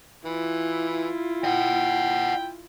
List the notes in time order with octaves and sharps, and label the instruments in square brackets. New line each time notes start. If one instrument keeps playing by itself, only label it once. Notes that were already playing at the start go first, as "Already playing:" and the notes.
[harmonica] E3 [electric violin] E4 F4
[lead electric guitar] D#5 F#5 [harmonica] G5